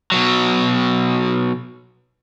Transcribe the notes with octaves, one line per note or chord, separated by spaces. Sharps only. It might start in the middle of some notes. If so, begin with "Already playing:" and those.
B2 F#3